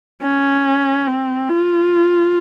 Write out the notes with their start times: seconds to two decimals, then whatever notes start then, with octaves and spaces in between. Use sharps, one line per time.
0.23 C#4
1.07 C4
1.49 F4